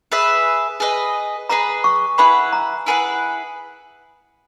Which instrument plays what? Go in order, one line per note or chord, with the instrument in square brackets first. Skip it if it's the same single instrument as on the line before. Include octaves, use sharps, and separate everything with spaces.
[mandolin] G#4 B4 E5
G#4 B4 D#5
[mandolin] G#4 B4 D#5 [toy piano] A#5
[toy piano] C#6
[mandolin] E4 G#4 B4 F#5 [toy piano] B5
[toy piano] A#5
[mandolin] E4 G#4 B4 F#5